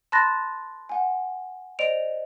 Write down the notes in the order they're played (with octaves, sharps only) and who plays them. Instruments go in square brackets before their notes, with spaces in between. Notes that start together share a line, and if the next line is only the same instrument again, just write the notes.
[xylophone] A5 B5 C6 F#6 A6 A#6
F#5 G#5
C5 D5 D#5 D7 F7